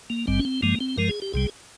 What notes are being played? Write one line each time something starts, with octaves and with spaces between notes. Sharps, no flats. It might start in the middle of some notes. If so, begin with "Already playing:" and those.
A#3
G#1 G2 G3 C4
C#4
C4
G2 F3 G#3 A#3
C4
G2 F3 G#3 A#4
G#4
G4
C2 C3 G3 G#4